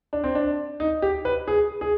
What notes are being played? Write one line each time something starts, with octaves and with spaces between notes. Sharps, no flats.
D4
C4
D4
D#4
G4
B4
G#4
G#4